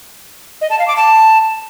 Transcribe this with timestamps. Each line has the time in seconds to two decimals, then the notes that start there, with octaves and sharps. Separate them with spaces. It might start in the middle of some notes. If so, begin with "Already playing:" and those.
0.61 D#5
0.70 A5
0.79 F5
0.88 D6
0.96 A5